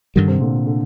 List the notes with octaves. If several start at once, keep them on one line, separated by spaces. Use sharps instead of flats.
G2 D3 D#3 G3
C3
A#2 D3
D3